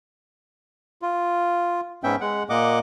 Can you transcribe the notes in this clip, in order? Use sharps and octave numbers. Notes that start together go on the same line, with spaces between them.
F4
G#2 B3 C#4 E5 G5
G#3 F#5
A#2 A#3 D#5 F#5 D6